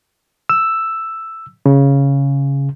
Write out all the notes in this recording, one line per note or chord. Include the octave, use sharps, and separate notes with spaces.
E6
C#3